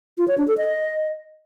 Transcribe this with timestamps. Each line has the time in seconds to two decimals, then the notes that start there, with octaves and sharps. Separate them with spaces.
0.18 F4
0.28 C#5
0.38 D4
0.48 A4
0.58 D#5